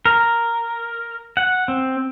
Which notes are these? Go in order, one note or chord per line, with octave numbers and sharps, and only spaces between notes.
A#4
F#5
C4